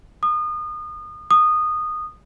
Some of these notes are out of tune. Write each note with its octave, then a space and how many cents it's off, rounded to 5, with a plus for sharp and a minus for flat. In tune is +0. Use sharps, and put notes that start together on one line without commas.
D#6 -30
D#6 -15